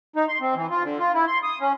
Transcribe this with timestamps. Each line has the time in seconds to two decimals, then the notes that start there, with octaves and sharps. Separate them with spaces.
0.16 D#4
0.29 C6
0.41 C4
0.55 E3
0.70 F4
0.83 D3
0.98 F4
1.14 E4
1.27 C6
1.43 D#6
1.60 C#4